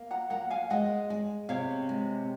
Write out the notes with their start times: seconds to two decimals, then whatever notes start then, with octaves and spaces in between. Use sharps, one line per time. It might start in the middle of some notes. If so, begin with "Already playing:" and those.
Already playing: A#3
0.11 F#5 A#5
0.30 A#3 F#5 A#5
0.50 F5 G#5
0.70 G#3 D#5 F#5
1.10 G#3
1.49 C3 C#5 F5
1.89 G#3